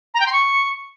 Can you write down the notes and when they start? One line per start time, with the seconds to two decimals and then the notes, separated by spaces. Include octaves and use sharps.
0.14 A#5
0.20 G5
0.26 C6
0.32 C#6